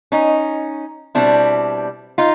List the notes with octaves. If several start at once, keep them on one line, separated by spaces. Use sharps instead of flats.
C#4 D#4
B2 G3 C4 D4 E4
D#4 F4